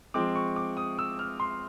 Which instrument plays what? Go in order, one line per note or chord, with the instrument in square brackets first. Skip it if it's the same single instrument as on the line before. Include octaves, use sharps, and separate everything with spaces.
[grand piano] F3 G#3 C4 D6
C#6
D6
D#6
E6
F6
C6